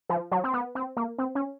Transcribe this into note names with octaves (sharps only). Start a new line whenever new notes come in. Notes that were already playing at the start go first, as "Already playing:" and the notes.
F3
F#3
C4
B3
C4
A#3
C4
C#4